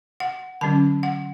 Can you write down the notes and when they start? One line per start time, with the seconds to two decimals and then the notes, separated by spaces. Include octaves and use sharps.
0.20 F#5
0.61 D3 F#3 C#4 A5
1.03 F#5